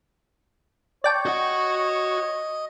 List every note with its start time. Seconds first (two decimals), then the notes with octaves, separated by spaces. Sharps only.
1.04 C#5 D5 G5 A5
1.26 F#4 D#5 F#5